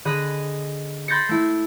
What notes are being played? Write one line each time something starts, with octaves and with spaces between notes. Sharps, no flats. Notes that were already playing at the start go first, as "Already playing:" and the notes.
D3 G#4 D#5 B5 F#6
B5 C6 G6 A6 A#6 C#7
A3 E4